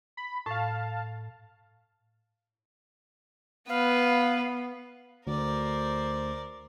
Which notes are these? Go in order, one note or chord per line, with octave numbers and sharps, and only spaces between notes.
B5
A2 F5 A5
B3 B4 F5
D2 A#4 C5 D5